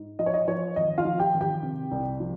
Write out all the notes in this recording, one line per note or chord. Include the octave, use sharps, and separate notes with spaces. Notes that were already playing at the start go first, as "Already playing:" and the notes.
Already playing: G#2
F3 D#5
C#5
D#5
F3 C#5
G#1 D#5
F4 F5
F3
G4 G5
G#1
G4 G5
C3
C2
F3